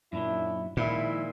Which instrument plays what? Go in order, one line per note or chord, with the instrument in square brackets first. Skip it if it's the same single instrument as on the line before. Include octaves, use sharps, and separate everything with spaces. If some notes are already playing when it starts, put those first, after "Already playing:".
[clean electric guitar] F#2 A#2 F#3 [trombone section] D#3 D4 E4
[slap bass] A#2 [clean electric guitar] D#3 F3 G#3 [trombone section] E4